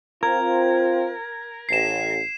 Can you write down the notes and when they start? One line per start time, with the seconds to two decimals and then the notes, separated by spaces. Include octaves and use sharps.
0.23 C4 F4 A#4 G#6
1.69 A1 C7 E7